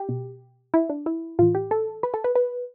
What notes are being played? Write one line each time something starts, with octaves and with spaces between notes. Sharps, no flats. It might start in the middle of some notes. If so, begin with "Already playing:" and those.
Already playing: G4
B2
E4
D4
E4
A2 E3 F4
G4
A4
B4
A4
B4
B4